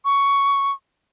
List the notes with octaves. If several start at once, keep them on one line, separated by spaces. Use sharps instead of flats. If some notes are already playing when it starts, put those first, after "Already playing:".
C#6